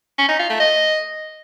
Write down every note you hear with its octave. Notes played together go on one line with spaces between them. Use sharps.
C#4
D#4
F4
A3
D#5